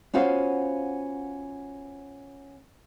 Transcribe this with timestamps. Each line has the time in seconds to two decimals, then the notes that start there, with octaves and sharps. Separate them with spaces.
0.14 B3 C#4 F4 F#4 C5 F5